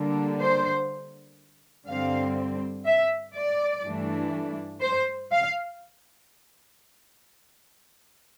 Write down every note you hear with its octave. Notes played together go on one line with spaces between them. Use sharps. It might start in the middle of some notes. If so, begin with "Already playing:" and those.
Already playing: D3 G3 A#3 D4
C5
G2 D3 G3 C4 F5
E5
D5
G2 E3 A3 D4
C5
F5